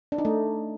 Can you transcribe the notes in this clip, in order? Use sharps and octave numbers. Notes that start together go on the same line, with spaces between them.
D4
D#4
A3